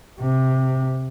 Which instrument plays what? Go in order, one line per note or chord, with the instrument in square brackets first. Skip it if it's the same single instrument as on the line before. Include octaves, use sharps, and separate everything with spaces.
[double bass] C3